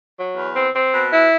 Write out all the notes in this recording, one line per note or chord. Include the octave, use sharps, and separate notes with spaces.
F#3
E2
C4
C4
B2
E4